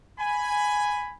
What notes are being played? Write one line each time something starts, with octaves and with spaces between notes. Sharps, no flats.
G#5 B5